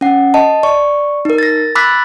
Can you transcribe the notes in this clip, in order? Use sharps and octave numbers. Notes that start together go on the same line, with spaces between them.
C#4 F#5
D#5 A5
D5 C#6
D#4 A#4
A6 A#6
B5 D6 E6 F#6 A6 B6